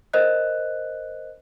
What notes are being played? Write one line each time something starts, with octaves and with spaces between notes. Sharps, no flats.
A#4 C5 D#5 F#6